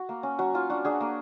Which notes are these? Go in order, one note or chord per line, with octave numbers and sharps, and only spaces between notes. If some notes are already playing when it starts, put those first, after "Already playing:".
Already playing: F#4
A#3
C#4
F#3 F#4
F#3 F4
D4 F#4
D4 F#4 G#4
A#3